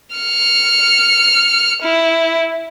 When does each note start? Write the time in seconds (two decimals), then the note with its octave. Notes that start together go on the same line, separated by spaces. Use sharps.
0.16 F6 C#7
1.82 E4